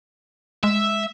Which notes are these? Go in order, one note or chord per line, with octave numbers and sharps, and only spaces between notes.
G#3 E5